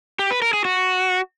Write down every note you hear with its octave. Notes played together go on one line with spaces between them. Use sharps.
G4
B4
A#4
G#4
F#4